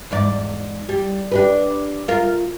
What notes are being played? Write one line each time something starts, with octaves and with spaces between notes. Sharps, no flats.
E2 G#2 D5
G3
D4 G4 B4
F4 A#4